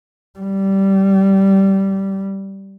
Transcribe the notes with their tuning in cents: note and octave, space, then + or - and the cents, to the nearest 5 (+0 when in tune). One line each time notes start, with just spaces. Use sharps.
G3 -15